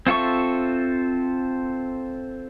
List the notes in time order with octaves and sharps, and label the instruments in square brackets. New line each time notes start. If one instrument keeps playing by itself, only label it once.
[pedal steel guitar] C4 F4 A4 E5 C#6